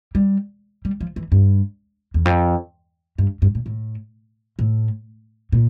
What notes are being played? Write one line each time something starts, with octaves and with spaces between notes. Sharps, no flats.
G3
G3
F3
E3
G2
E2
F2
G2
G2
A#2
A2
A2
A#2